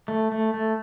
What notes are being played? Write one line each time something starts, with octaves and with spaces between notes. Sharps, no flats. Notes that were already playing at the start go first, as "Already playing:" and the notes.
A3
A3
A3